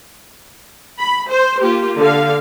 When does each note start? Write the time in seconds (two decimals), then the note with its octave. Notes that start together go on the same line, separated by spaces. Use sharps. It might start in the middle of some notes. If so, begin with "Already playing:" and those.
0.99 B5
1.29 C5
1.60 A#3 F4 G4
1.99 D3 F5